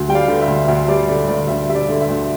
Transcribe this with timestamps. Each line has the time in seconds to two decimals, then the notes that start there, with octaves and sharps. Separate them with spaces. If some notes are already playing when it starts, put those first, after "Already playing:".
Already playing: D2
0.08 G3 G5
0.15 D5 F5
0.28 D3
0.41 E5
0.48 D2
0.68 D2 E5
0.88 G3 D5
1.08 D3 D5
1.28 D2 D5
1.48 D2 E5
1.69 G3 E5
1.75 D5
1.89 D3
2.02 E5
2.09 D2